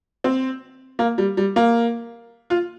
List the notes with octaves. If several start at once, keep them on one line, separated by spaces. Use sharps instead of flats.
C4
A#3
G3
G3
A#3
F4